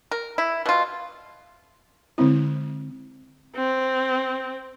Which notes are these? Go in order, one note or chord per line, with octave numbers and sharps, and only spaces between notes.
A#4
E4
B2 F4
D3 G#3 C4 E4
C4